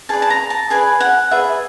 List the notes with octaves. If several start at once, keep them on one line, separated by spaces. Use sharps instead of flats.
G#4 B4 D5 A5
A5
A#5
A5
G#4 B4 D5 G#5
F#5
G#4 B4 D5 E5